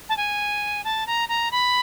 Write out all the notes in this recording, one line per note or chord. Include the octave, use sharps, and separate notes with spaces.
A5
G#5
A5
A#5
A#5
B5